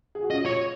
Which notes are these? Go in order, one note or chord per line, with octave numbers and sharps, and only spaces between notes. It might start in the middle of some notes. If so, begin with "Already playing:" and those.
G#4
F#4
C#4 F4 D#5
C#5